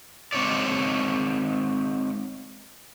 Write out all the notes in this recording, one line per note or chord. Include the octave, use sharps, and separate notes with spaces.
G#3 C4 D#4 C#5 D5